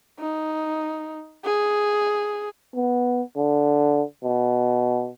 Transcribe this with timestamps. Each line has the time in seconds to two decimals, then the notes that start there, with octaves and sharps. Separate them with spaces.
0.19 D#4
1.45 G#4
2.75 B3
3.36 D3
4.24 B2